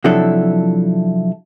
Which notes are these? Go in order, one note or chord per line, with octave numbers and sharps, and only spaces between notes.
C3 F3 F#3 D4 E4 A4